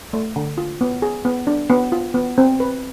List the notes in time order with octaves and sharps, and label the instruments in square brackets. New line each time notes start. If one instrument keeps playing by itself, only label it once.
[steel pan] A3
D3
F4
B3
G#4
B3
D4
B3
F4
B3
C4
B4